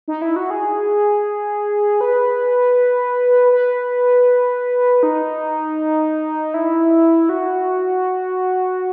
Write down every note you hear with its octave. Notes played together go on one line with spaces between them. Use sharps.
D#4
E4
F#4
G#4
B4
B4
D#4
E4
F#4